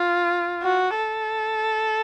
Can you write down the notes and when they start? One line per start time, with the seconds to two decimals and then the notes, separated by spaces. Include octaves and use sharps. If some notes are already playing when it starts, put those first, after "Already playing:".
Already playing: F4
0.63 F#4
0.96 A4